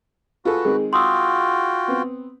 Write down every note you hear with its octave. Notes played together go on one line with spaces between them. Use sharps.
F4 F#4 G#4 A4 B4
D#3 G#3 C4 G#4
F4 F#4 G5 C6 D#6 E6
B3 C4